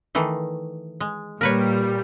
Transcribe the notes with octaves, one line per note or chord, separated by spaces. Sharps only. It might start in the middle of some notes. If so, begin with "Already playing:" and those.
D#3 E3 A3
G#3
A#2 G3 A#4 B4 C#5